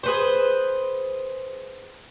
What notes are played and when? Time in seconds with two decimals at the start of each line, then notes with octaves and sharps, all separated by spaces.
0.03 G#4 B4 C5